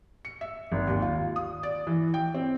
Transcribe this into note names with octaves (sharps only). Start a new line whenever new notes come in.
C#7
E5
G#1
D#2
F4
D#6
D5
E3
G5
C4